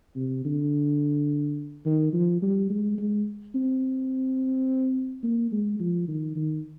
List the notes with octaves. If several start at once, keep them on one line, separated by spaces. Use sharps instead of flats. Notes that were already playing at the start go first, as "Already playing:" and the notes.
C3
D3
D#3
F3
G3
G#3
G#3
C4
A#3
G#3
F3
D#3
D#3